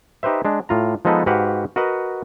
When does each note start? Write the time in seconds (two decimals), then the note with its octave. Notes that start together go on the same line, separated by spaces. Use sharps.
0.23 D#4 G4 B4 C5 E5
0.45 G#3 D4
0.69 A2 F4 A#5
1.05 F3 G#3 B3 D#4 A4 B4
1.26 G#2 F#4 G4 B4 F5 F#5
1.76 F#4 A#4 B4 D#5 F#5